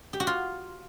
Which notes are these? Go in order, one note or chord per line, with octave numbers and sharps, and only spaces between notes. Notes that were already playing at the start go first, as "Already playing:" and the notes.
G4
F#4
F4